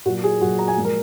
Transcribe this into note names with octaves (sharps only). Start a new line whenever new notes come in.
A#2 F#3 F#4
G#4
A#2 F#3 F#4
A#5
G#5
A#2 F3 G#3
A#4